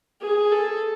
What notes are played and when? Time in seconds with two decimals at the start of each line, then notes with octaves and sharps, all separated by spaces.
0.21 G#4
0.52 A4